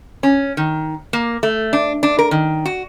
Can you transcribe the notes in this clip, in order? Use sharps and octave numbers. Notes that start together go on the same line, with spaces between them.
C#4
D#3
A#3
A3
D4
D4
A#4
D#3
F#4